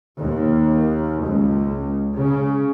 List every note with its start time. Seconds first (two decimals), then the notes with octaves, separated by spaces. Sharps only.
0.21 D#2
1.27 C#2
2.18 C#3